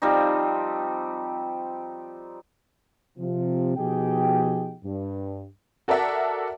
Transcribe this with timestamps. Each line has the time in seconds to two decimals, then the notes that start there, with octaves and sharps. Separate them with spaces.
0.02 F3 G3 C4 D#4
3.18 C3 F3
3.77 B2 F3 D#4 G4 G#4 G5
4.83 G2
5.88 F#4 A4 A#4 D5 E5 F#5